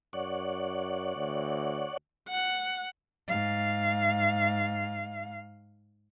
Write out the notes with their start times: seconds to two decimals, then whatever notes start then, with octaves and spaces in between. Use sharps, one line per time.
0.13 F#2 C#5 D5 F#5
1.16 D2
2.28 F#5
3.29 G#2 F5